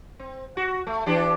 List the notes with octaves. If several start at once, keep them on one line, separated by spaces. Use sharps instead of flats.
C4
F#4
A3
E3 D4 G4